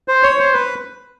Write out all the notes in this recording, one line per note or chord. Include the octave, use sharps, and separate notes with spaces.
C5
C#5
C5
B4